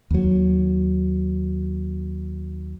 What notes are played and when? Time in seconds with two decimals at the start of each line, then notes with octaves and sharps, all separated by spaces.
0.11 D#2 F#3